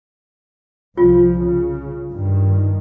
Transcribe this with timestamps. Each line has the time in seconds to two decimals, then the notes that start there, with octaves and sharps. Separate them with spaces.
0.97 C2 F3 F4
1.39 C#3
2.11 G2 D#3